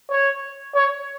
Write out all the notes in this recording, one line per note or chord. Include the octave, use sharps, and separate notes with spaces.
C#5
C#5